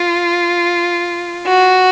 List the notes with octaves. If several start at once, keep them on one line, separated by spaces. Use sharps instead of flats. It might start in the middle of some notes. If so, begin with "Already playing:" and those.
Already playing: F4
F#4